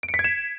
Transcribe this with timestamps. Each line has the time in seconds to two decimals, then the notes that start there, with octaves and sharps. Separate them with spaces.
0.03 D7
0.09 C#7
0.14 B6
0.19 G#6
0.24 E7